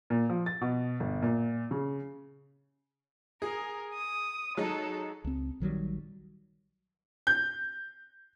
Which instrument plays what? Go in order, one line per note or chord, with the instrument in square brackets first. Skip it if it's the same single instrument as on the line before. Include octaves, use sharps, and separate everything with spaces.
[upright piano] A#2
F3
A6
B2
G1
A#2
C#3
[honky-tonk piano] G#4 [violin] A#4
[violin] D#6
[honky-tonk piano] F#3 G#3 D#4 [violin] A4
[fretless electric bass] C#2 C4
A#1 D#3 F#3 G3
[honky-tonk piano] G6